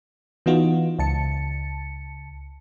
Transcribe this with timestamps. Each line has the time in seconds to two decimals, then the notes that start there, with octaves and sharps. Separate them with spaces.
0.46 E3 B3 D#4 F4 F#4
0.99 C#2 A5 C#7